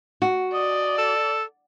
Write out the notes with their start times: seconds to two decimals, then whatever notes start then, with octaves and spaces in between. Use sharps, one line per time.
0.22 F#4
0.53 D5 D#5
0.98 A4